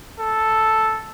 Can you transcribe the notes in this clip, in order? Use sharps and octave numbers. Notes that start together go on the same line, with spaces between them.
A4